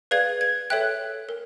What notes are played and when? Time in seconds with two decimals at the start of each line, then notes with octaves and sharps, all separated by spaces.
0.11 G#4 B4 D5 F5 G#6
0.41 G#6
0.70 A4 C#5 E5 G5 F#6
1.29 A#4